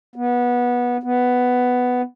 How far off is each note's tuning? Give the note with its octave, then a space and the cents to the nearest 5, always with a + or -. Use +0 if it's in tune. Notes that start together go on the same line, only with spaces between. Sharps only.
B3 -20
B3 +5